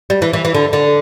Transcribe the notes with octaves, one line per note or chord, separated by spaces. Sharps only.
G3
E3
E3
E3
D3
D3